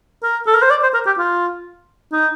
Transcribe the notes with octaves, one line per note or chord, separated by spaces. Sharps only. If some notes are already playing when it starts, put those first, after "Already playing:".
A#4
A4
A#4
C5
D5
C5
A#4
G4
F4
D#4